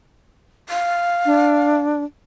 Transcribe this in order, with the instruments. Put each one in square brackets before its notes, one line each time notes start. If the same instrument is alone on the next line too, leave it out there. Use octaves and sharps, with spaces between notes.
[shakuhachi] F5
[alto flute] D4